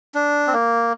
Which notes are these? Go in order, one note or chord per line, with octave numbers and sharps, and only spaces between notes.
D4
C4
A#3